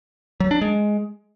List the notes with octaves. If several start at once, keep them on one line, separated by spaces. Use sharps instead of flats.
F#3
D4
G#3